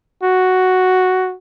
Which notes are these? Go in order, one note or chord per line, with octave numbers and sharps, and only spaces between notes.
F#4